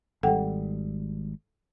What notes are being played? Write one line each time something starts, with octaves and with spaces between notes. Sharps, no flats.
G#1 G3 A4 F#5 G5